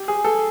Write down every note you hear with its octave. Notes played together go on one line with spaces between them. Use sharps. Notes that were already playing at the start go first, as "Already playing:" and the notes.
Already playing: G4
G#4
A4